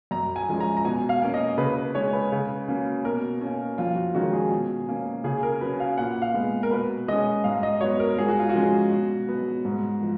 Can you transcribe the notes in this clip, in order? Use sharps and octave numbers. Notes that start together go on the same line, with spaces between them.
F#2 A#5
G#5
F3 G#3 C#4
A#5
A#5
B2 G#5
F5
A#3 C#4
D#5
C#3 B4
B4
G#3 C#4 C#5
B4
C#3
F#3 A#3 C#4
B2 A#4
A#3 C#4
F2 F4
F#4
D#3 G#3 C#4 F#4
G#4
B2
A#3 C#4
C#3 G#4
A#4
F#3 C#4 B4
F5
A#2 F#5
F5
G#3 B3
A#4
B2 B4
G#3 C#4 D#5
G#2 F5
D#5
F#3 B3 C#5
A#4
G#2 G#4
F#4
F4
F#4
F3 G#3 C#4
B2
F#3 B3
G#2
F3